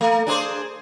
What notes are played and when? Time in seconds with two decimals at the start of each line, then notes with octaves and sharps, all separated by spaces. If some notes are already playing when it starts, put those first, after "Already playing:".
0.01 A3
0.27 D4 G#4 C5